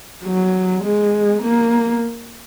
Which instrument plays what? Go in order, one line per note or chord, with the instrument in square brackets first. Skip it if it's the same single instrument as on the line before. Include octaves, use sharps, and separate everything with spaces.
[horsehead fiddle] F#3
G#3
A#3